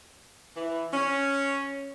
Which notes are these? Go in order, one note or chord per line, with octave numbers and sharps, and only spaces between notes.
E3
C#4